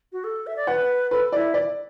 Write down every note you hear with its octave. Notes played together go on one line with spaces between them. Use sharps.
F#4
A4
E5
D5
B4 F#5
A4 B4
E4 D5
D5